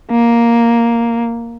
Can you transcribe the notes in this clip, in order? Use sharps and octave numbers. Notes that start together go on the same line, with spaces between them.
A#3